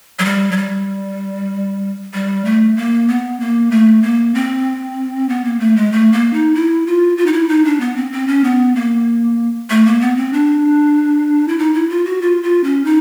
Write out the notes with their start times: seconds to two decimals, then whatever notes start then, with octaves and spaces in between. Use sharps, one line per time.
0.19 F#3
0.25 G3
0.51 F#3
0.57 G3
2.14 G3
2.45 A3
2.76 A#3
3.08 B3
3.40 A#3
3.71 A3
4.02 A#3
4.35 C4
5.29 B3
5.45 A#3
5.60 A3
5.76 G#3
5.92 A3
6.12 A#3
6.33 D#4
6.55 E4
6.86 F4
7.17 F4
7.26 D#4
7.33 E4
7.49 D#4
7.65 D4
7.80 B3
7.96 C4
8.12 C4
8.28 C#4
8.44 B3
8.76 A#3
9.70 A3
9.86 A#3
10.01 B3
10.16 C4
10.33 D4
11.48 E4
11.59 D#4
11.74 E4
11.90 F4
12.05 F#4
12.21 F4
12.43 F4
12.64 C#4
12.85 D#4